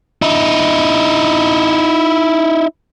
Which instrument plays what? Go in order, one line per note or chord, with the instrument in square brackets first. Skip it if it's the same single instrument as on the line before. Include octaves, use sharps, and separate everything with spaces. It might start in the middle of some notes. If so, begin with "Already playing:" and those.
[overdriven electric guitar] D#4 E4